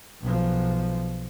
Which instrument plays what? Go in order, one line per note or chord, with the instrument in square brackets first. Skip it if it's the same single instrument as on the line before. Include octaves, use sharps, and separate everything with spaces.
[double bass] B1 F3